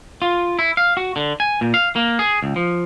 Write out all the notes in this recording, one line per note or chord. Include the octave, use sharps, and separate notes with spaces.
F4
E4
F5
F#4
D3
G#5
A#2
F5
A#3
G#4
C#2
F3